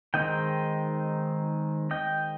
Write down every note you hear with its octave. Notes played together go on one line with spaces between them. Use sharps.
D#3 G#3 C4 D#4 D#5 G5
D#5 G5